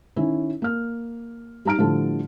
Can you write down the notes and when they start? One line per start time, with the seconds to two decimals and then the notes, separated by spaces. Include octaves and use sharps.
0.16 D#3 C#4 E4
0.62 A#3 F6
1.65 G3 D#4 A#5 F6 D7
1.78 A2 D3 F3 G3 A4 A5